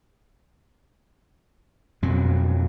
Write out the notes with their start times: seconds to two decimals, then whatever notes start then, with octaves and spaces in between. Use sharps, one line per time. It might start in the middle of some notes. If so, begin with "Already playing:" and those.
2.02 F2 B2 F#3